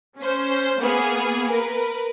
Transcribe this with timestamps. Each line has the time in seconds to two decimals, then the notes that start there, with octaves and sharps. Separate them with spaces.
0.18 C#4 C5
0.80 A#3 B3 G#4
1.50 A#4 B4